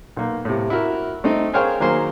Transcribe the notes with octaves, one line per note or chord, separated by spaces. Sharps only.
B1 A#3
A2 C3
E4 F#4 A#4
A3 C4 D#4
G#4 A#4 C5 C#5 F5 G5
D#3 F#3 A#3 G#4 A#4 C5